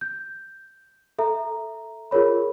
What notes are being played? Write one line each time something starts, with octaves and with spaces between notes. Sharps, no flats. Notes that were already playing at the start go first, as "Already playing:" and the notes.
G6
A4 E5 A#5
F4 G#4 A#4 C#5 B5